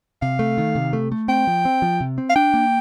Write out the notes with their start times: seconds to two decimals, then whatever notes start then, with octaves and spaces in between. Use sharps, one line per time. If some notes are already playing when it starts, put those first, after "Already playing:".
0.22 C3 F5
0.39 A3
0.58 D#3
0.75 C3
0.93 A3
1.12 A3
1.28 C4 G5
1.47 F3
1.65 C4
1.82 F3
2.01 C3
2.18 C4
2.30 F5
2.36 D4 G5
2.54 A#3